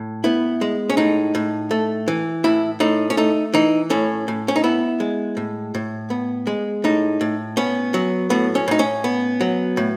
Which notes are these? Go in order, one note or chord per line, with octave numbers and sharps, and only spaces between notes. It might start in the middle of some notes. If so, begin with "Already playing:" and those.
Already playing: A2
B3 E4
G#3
C#4
A2 D#4
A2
A3
E3
A2 E4
A2 D#4
C#4
A3 D#4
E3 D#4
A2 C#4
A2
C#4
D#4
B3 E4
G#3
A2
A2
B3
G#3
A2 D#4
A2
B3 C#4
F#3
A2 B3
C#4
A2 D#4
C#4
B3
F#3
A2